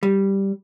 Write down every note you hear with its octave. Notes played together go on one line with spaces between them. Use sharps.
G3